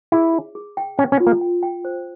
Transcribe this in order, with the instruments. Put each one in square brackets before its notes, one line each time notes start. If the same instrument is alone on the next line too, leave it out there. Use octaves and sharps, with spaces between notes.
[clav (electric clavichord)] E4 [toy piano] G#4
[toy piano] G#4
G#4
G5
[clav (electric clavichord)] C#4 [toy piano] G5
[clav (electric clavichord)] C#4
[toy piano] F4
[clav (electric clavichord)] A#3
[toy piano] G5
G5
C5